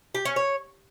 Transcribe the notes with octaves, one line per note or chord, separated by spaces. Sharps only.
G4
C#4
C#5